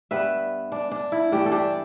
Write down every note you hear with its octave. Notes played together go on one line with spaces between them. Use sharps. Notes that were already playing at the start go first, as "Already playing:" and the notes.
G2 G3 B3 B4 E5
D4
D4
E4
G2 E3 A3 D4 G4
A4
D4 G4